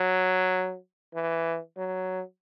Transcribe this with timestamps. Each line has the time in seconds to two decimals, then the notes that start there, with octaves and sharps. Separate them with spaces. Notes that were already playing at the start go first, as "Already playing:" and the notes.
Already playing: F#3
1.15 E3
1.77 F#3